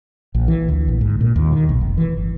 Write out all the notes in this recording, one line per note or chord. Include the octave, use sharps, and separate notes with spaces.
A#1
E3
D2
A#1
G#2
A#2
D#2
D#3
B1
F1
E3
G1